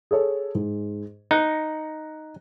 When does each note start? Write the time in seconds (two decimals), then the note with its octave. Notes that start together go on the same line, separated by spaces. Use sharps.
0.11 G#4 A4 C#5
0.55 G#2
1.31 D#4 F#6 A#6 C#7